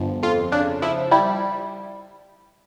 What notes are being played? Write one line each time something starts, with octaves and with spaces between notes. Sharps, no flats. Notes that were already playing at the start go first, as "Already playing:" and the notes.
Already playing: G1 F3
F2 F4
C#3 D4
F3 E4
G3 E4